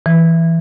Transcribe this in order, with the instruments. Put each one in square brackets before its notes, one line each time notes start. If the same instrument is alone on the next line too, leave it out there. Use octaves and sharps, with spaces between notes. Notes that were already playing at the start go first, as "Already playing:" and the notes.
[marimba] E3